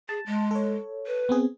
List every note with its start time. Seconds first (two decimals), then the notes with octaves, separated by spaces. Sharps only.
0.09 G#4 A5
0.26 G#3
0.51 A4 C#5
1.07 B4
1.29 B3 C4 G#4